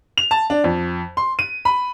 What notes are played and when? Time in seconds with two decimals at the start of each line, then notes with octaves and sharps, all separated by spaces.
0.18 F7
0.31 A5
0.50 D4
0.64 F2
1.17 C6
1.39 D#7
1.65 B5